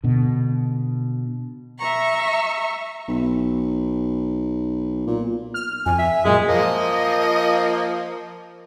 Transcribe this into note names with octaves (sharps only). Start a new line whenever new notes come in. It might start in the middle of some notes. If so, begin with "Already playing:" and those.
B2 D3
E5 A#5 C#6
B1
A#2
F6
F2 G#5
E5
F#2 A#2 G#3 G#4
F3 A#3 D#5